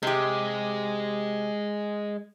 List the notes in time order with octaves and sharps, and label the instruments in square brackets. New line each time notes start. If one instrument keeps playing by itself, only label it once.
[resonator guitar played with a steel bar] C3 G4 [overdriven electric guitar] G#3